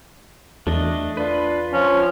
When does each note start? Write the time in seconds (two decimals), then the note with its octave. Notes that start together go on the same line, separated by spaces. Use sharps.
0.67 E2 A3 D4 D#5
1.17 D4 F4 B4
1.73 F3 C#4